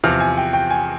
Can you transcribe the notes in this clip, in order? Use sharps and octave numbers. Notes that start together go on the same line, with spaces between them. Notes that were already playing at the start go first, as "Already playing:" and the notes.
E2 C3 F3 F6
G#5
G5
G5
G#5